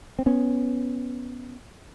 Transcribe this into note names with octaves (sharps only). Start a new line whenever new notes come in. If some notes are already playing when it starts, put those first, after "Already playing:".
C4
B3 C#4